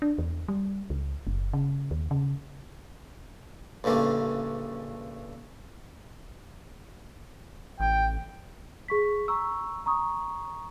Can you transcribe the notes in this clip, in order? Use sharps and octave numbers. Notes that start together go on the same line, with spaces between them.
D4
E2
G3
C#2
F#1
C#3
D#2
C#3
A1 G2 C#3 A3 A#3
A1 G5
G#4 C#6 B6
A#5 C#6 E6
A#5 C#6 D#6